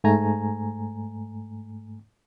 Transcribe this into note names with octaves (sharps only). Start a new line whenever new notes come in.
G#2 A3 G#5 A#5